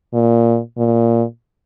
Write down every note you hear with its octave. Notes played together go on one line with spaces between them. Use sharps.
A#2
A#2